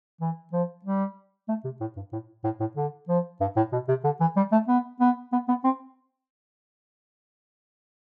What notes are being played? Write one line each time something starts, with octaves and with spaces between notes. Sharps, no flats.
E3
F3
G3
A3
C3
A2
G2
A2
A2
A2
D3
F3
G2
A2
B2
C3
D3
E3
G3
A3
B3
B3
B3
B3
C4